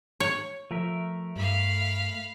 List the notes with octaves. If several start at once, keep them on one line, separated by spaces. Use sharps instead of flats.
C#5
F3 A3 A#4 E5
G2 F5 B5